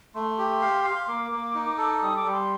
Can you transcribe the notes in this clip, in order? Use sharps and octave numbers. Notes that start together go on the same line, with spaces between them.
A3 C6
G4
F5
F5
A#3 D6
A#3
D#4
A4
G3 D#6
D6
G3
C6